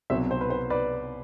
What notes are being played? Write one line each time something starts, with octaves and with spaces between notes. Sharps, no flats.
C2 B2 F#3 C5 E5
C5
B4
C5
B4 D5